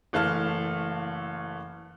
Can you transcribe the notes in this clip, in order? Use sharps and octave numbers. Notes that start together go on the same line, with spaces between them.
F#1 E3 A3 F5 A5 F6